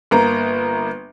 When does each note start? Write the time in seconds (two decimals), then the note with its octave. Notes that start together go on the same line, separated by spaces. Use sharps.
0.11 G1 A#3 A#5